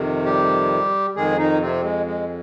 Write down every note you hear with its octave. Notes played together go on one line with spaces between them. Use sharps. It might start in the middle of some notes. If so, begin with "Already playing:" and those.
Already playing: F2 C3 D#3
G3 G4
F2 D#3 G#3 G#4
D#3 D#4
C3 C4
G#3
G#3